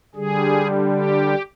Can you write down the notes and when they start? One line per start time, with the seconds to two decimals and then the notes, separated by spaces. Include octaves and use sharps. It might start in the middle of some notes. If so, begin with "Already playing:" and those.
0.15 D3 G3 G#4
0.90 G4